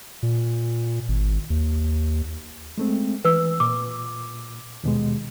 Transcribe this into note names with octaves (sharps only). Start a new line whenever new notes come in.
A#2
G#1
D#2
G#3 A3 C4
E3 B4 E6
A#2 D6
D#2 B2 G#3